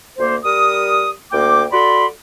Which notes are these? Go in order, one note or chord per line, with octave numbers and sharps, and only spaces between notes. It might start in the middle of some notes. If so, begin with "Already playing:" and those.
D2 A#3 C5
G3 A#4 D#6
D2 A#3 G5 D6
F#4 A4 D5 B5 C6